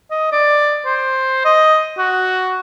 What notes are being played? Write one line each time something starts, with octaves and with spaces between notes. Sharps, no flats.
D#5
D5
C5
D#5
F#4